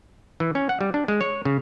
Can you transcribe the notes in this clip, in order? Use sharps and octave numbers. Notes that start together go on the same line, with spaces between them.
E3
C#4
F#5
G3
D4
G#3
C#5
C#3